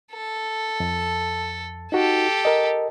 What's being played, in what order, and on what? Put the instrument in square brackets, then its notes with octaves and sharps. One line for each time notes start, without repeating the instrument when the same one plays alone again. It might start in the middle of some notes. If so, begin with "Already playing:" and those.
[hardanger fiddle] A4
[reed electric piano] F2
[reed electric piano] D#4 F#4 [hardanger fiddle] G4 A4
[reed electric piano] A#4 D#5